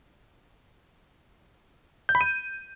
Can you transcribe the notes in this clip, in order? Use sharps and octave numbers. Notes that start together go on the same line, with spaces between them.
G6
B5
D#7